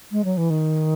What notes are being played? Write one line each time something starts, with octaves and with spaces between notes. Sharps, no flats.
G#3
F#3
E3
D#3